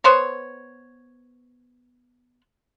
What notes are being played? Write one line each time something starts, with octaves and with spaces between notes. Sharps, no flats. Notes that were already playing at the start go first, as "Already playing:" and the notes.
B3 C5 C#5